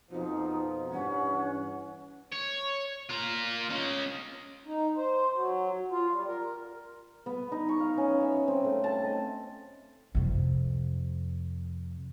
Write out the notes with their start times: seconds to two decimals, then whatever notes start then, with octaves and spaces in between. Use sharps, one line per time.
0.10 F2 B2 F3 D#4
0.91 G2 E3 C#4 F#5
2.33 C#5
3.10 F4 A#4
3.70 C#4 D#5
4.66 D#4
4.96 C5
5.33 F#3
5.92 F4
6.11 G3
6.27 A#4
7.26 B3
7.52 D#4
7.69 C#6
7.80 F5
7.98 C#4
8.21 E5
8.48 C4
8.64 A3
8.84 A5
9.04 D#5
10.15 F2 C3